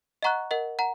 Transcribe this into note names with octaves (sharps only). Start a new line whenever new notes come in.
D#5 F#5 A#5 C#6 F#6
A#4 D#5 F#5
F#5 A#5